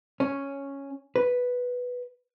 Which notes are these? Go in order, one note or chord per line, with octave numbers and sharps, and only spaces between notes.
C#4
B4